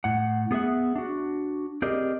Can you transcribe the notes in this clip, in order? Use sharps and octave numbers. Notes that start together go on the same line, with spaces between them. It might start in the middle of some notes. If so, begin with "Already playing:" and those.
A2 F#5
B3 G#4 A4 E5 F#5
D4 F#4
C4 G4 G#4 A#4 D5 D#5